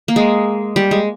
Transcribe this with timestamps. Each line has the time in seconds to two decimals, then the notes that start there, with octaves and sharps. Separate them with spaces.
0.08 A#3
0.16 G#3
0.76 G3
0.91 G#3